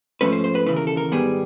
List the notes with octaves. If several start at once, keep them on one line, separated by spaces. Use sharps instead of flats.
G#2 F3 A3 C#4 B4
C5
C5
B4
D#2 C#3 E3 B4
A#4
A4
A#4
G#2 D#3 G3 B3 G#4